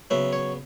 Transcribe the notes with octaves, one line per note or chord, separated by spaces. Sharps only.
C#3 F#3 B3 E5
C#5